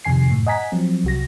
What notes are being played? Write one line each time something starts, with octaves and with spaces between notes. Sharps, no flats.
F2 C3 D#3 G#5 C7
F#2 A2
D#5 F#5 G#5 A#5 B6
F3 F#3 C4
C2 F#4 A#6